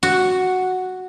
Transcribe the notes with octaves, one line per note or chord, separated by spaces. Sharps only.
F#4